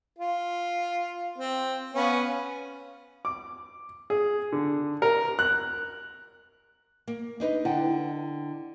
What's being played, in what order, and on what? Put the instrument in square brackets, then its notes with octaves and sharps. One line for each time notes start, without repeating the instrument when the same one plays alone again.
[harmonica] F4
C4
B3 C#4 F5
[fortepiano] D6
G#4
D3
A#4
F#6
[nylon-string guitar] A#3
D4 D#4 B4
[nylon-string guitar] D3 [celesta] E4 F#5 G5